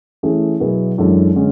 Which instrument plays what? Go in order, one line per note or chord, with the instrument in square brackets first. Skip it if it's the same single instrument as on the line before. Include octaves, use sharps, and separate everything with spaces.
[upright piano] E3 A3 C#4 G#4
B2 F#3 B3 E4 G#4
F#2 E3 G#3 D4 A4
D3 G#3 C#4